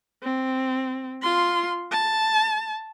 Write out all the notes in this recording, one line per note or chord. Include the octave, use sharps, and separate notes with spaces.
C4
F4 C6
A5